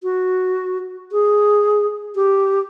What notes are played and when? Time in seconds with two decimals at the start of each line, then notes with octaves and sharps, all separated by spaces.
0.03 F#4
1.12 G#4
2.15 G4